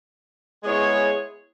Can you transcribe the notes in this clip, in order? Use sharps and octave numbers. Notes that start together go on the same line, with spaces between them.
G#3 B3 E4 G#4 C#5